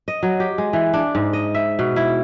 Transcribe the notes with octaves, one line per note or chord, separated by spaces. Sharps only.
D#5
F#3
G4
G#3
E3
D4
G#2
D#5
E5
B2
E4